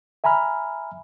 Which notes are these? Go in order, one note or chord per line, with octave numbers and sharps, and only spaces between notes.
E5 G#5 A#5 B5 F6